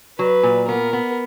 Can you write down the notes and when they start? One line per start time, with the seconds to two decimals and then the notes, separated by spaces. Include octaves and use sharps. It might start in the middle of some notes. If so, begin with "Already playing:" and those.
0.19 F#3 B4
0.43 A#2
0.68 B3 A#4
0.93 B3